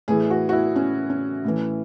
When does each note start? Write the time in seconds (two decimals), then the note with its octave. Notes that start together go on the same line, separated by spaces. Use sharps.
0.08 A2 E3 G#4
0.30 F#4
0.49 F#4
0.52 E4
0.76 C#4
1.10 C#4
1.45 A2 E3